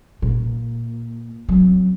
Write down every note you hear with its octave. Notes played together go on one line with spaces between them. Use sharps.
A#2
F#3 C4